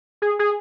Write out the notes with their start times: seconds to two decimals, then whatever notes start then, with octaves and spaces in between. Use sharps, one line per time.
0.22 G#4
0.39 G#4